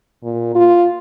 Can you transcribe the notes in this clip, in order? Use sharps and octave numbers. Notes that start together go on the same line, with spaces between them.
A#2
F4